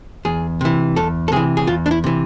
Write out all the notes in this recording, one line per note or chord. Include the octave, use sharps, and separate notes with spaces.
E2 G#4
C3 E3
E2 A4
A4
C3 E3 G#4
G#4
E2 F4
D4
E4
C3 E3